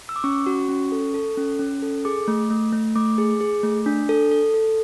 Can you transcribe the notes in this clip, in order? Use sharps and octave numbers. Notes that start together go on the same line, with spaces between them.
E6
D6
C#4 C#6
F#4
C#4
A4
A4
C#4
C#4
A4
G#4 D6
A3
A3
A3
A3 D6
G#4
G#4
A3
D4
A4
A4
A4